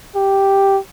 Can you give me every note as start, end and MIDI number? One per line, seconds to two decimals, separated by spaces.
0.16 0.79 67